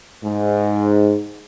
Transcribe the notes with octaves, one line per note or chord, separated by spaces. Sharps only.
G#2